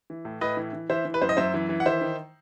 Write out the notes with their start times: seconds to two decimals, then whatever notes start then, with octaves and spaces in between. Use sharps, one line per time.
0.10 E3
0.25 A2
0.41 A2 B4 D#5
0.57 E3
0.73 E3
0.89 E3 C5 E5
1.05 E3
1.14 B4
1.22 F#2 C5
1.29 D#5
1.37 F#2 C5 E5
1.54 E3
1.69 E3
1.80 F#5
1.85 D#3 C5 E5
2.01 D#3